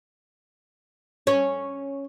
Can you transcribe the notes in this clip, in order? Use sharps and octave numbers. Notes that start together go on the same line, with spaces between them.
C#4